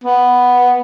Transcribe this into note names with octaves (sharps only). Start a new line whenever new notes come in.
B3